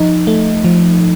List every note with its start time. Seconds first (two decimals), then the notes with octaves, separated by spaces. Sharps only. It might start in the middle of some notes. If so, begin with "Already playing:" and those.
Already playing: F3 D#4
0.27 A3
0.64 F3